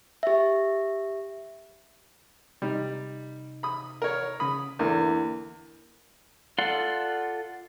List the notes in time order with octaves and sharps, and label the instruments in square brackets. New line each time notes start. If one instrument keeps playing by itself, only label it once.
[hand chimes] G4 E5
[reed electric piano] C3 D#4 [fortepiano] G3
[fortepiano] B5 D#6
A#4 C#5
[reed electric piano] C#3 D#6 [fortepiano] B5
[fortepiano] E2 D3 [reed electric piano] A#3 E4 A#4
[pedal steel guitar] F4 A4 D5 F#5 C6